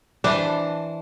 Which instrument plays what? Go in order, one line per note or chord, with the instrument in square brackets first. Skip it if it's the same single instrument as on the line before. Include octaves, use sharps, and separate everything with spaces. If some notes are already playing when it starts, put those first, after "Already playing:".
[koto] E3 C5 A5 [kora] D4